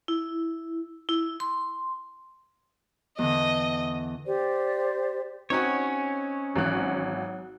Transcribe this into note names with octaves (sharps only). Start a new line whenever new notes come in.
E4
E4
C6
E2 D3 D#5
G4 C5 D5
C4 C#4 D#4 F#4 C#5
G#1 E3 F#3 F#6